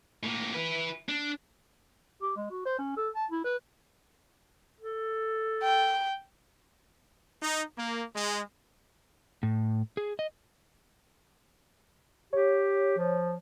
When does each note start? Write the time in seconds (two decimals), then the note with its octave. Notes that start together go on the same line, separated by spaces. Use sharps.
0.23 A2 A#3
0.54 E4 B4
1.09 D4
2.22 G4
2.36 G#3
2.51 F#4
2.66 C5
2.79 C#4
2.97 A4
3.15 A5
3.31 E4
3.44 B4
4.80 A4
5.63 G5
7.42 D#4
7.78 A#3
8.14 G#3
9.43 A2
9.97 G#4
10.19 D#5
12.33 G4 C#5
12.98 F3